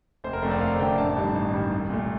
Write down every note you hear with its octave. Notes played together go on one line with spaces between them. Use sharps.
F1 C5
A#4
F2 D3 A3 D4 C5
D5
F1 F5
F2 D3 A3 D4 G5
A1 A5
G2 D#3
A1
G2 D#3
C2
A#2 A3